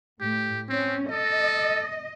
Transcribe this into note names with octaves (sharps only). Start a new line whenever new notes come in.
A2 G4
C4 C#4
A4 D#5